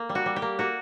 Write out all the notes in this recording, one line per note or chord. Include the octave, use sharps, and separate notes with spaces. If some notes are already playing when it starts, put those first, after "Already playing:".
Already playing: A#3
G3
F#4
G3
G4
A#3
A#3 F#4